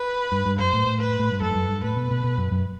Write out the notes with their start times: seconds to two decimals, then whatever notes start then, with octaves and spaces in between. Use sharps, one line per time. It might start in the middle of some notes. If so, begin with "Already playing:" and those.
Already playing: B4
0.32 G2
0.46 G2
0.59 F#2 C5
0.73 A2
0.87 A2
1.00 B4
1.20 A2
1.32 G2
1.41 F#2 A4
1.51 G2
1.55 F#2
1.69 G2
1.83 A2 B4
1.96 B2
2.11 B2
2.24 B2
2.38 F#2
2.52 F#2